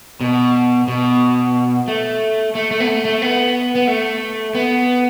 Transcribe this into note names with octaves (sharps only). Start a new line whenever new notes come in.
B2
B2
A3
A3
A3
B3
A3
A3
B3
B3
A3
B3